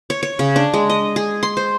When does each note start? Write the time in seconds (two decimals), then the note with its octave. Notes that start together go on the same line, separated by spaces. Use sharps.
0.10 C#5
0.23 C#5
0.39 C#3
0.56 D4
0.73 G#3
0.90 D#5
1.16 G#4
1.43 C6
1.57 C5